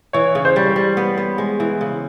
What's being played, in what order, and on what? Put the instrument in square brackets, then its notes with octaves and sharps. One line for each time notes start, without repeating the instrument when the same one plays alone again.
[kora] E3 [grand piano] C#5
[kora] C#3
[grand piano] C5
[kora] G3
G3
B3
B3
G#3
E3
C#3